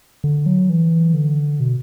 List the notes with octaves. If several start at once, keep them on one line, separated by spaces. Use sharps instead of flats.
D3
F#3
E3
D3
B2